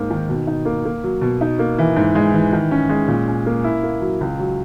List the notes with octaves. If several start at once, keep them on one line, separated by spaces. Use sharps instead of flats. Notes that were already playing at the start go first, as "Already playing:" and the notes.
Already playing: G#2 A#3
D#3
B2
D#4
A#3
A#3
F#3
B2
D#4
A#3
E3
G#2
G#3
E3
D#3
C#4
G#3
A#2
C#4
A#3
E4
A#3
F#3
C#2
F#3